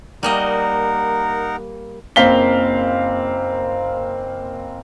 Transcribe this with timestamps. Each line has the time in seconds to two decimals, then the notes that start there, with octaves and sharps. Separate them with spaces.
0.23 G3 A#3 D#4 A#4 D#5 F#5
2.16 F#1 A#3 C4 F5 B6 G7